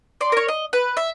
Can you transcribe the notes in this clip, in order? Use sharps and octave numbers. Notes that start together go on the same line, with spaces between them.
D5 C6
A#4 C#5
D#5
B4
E5